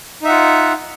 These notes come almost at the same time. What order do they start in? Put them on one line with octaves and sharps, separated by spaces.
D#4 E5 F#5 F4